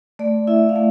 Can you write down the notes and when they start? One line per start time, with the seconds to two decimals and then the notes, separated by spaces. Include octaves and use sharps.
0.19 A3 D5
0.47 E4 E5
0.69 F5
0.76 A3